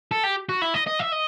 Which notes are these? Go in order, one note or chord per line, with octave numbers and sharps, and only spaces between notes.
A4
G4
F#4
E4
D#5
D#5
E5
D#5